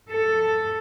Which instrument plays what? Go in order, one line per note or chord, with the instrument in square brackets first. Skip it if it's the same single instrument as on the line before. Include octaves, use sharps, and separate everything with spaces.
[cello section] A4